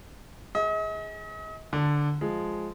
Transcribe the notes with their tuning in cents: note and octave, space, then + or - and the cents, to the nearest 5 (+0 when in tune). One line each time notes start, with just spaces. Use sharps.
G#4 +0 D#5 +40
D3 +0 A5 +10
F3 +0 G#3 +0